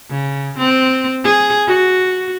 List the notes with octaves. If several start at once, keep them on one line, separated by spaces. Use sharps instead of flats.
C#3
C4
G#4
F#4